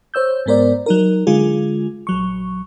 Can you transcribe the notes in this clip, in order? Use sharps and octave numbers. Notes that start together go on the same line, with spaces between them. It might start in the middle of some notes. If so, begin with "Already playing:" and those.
C5 C#5 E6 G6
G#2 G#3 B3 A#4 C5 D5
F#3 D#4 A#4
D3 G#3 F4 G#4
A#1 F#3 C#6